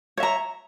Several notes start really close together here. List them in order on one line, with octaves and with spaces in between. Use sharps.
C#5 E5 A#5